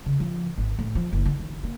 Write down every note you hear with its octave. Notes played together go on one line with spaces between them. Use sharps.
C#3
F3
G#1
A2
F3
F#1
D3
D#3
A#3